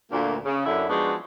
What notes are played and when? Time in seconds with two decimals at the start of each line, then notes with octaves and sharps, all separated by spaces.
0.12 D2 A#2 A#3
0.45 C#3
0.66 F#2 D3 E4
0.88 F3 G#3 B3 D4 D#4 F#4